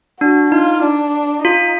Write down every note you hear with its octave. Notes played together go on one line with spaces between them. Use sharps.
D4 F#4
D#4 F4
D4
D#4 F4